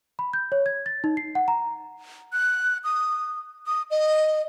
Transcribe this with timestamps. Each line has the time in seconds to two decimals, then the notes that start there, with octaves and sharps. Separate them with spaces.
0.19 B5
0.33 G6
0.52 C#5
0.66 G#6
0.86 A6
1.04 D#4
1.17 C7
1.35 F#5
1.48 A#5
2.33 F#6
2.84 D#6
3.66 D#6
3.91 D#5